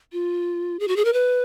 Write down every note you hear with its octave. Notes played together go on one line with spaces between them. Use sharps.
F4
G#4
F#4
G#4
A#4
B4